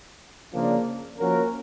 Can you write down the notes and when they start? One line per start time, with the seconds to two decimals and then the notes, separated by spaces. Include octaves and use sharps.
0.54 C#3 F3 A#3 D4
1.18 F3 A#3 C#4 F#4 A#4